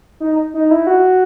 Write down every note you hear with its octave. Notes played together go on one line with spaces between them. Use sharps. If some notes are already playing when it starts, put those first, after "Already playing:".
D#4
D#4
E4
F#4